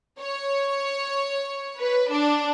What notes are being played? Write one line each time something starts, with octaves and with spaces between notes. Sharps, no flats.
C#5
B4
D4